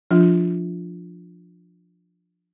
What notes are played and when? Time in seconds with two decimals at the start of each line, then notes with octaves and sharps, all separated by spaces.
0.11 F3 D4 F4